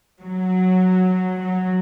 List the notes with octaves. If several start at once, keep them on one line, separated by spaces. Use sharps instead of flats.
F#3
F#3